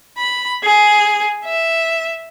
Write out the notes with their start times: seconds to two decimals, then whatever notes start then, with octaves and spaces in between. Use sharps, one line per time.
0.18 B5
0.64 G#4
1.45 E5